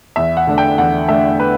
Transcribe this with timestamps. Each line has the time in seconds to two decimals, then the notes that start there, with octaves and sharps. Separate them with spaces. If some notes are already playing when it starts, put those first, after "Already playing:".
0.16 E2 E5
0.37 F#5
0.47 D3 A3 D4
0.58 G5
0.78 E2 F#5
1.08 D3 A3 D4 E5
1.40 B4